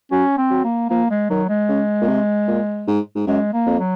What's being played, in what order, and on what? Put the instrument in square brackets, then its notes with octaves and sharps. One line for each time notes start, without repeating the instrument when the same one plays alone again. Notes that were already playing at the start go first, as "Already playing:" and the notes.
[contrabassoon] F#3 [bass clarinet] C#4
[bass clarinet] C4
[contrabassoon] F#3
[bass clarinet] A#3
[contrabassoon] F3 [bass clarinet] A#3
[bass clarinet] G#3
[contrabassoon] D#3 [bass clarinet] F#3
[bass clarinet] G#3
[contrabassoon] C#3
A#2
C3
A#2
G#2
G#2
[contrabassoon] F#2 [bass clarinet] G#3
[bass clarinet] A#3
[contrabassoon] F2
[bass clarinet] F#3